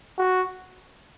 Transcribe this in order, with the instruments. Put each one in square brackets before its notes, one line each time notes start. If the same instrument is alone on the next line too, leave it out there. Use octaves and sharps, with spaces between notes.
[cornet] F#4